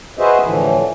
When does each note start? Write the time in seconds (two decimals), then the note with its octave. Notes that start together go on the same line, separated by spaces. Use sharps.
0.19 F#4 G#4 B4 C5 D#5 E5
0.43 A2 D3 E3 F3